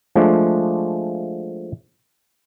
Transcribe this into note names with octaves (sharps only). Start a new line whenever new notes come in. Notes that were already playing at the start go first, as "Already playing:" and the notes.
F3 G#3 A3 D4